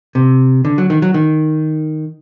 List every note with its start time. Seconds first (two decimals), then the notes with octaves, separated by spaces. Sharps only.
0.15 C3
0.65 D3
0.78 F#3
0.90 D#3
1.02 F#3
1.14 D#3